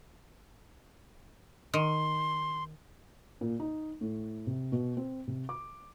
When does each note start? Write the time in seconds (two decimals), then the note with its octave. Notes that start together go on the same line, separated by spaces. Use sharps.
1.74 D#3 C6
3.41 A#2
3.60 D#4
4.01 A2
4.47 C3
4.72 B2
4.97 C4
5.28 C3
5.49 D6